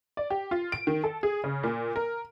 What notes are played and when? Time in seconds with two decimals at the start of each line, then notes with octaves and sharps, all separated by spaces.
0.17 D5
0.30 G4
0.51 F4
0.72 D7
0.87 D#3
1.04 A4
1.23 G#4
1.44 C#3
1.63 A#2
1.96 A#4